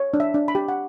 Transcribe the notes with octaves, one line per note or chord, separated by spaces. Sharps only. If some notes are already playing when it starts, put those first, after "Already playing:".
Already playing: C#5
D4
E5
D4
B5
G4
F#5